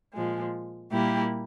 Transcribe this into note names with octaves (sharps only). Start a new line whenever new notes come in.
A#2 F3 G#3
A#2 G3 A#3 E4 G4